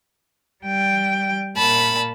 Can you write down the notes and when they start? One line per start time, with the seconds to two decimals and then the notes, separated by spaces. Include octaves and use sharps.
0.64 G3 G5
1.57 A#2 A5 B5